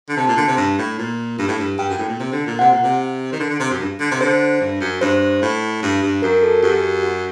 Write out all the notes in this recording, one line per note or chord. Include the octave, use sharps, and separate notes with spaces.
D3
C3 A5
A#2
D3
C3
G2
A2
A#2
G2
A2
G2
G2 G5
F#2
A2
A#2
C3
D3
A#2
C3 F#5
A#2
C3
D#3
D3
D3
C3
F#2
G2
D3
C3
D3 C5
G2
F#2
G2 C5
A2
G2
G2
F#2 A#4
A4
F#2 G4
F#4